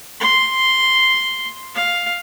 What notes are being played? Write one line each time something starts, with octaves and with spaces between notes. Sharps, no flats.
C6
F5